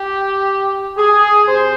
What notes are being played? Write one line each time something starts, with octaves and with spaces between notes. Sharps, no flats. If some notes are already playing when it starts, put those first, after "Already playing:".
Already playing: G4
G#4
C3 C5